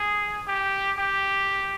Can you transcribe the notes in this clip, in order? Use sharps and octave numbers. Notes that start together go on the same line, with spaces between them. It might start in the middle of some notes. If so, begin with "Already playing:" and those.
Already playing: G#4
G4
G4